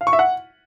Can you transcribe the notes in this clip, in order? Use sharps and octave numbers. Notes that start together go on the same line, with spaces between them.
F5
C#6
E5
F#5